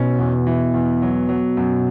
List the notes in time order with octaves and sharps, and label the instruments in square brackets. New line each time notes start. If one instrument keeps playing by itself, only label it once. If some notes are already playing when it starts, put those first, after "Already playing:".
Already playing: [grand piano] B1 C#4 [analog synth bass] B2
[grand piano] E2
E3
E2
F#3
F#3
F#2